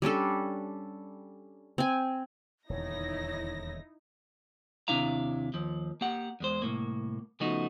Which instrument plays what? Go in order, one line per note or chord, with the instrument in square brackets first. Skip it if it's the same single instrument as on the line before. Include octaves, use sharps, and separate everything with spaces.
[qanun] G3 C#4 D4 A4
C4 G#5
[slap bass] D#1 E2 D3 [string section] D#4 E4 A#6 [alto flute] C#5
[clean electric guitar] D#2 C3 D4 E4 F5 A#5
D#2 F3
A#3 G4 F#5
E2 G#3 C5
C2 A2 A#3
C#3 F3 A3 B3 D#4 F#4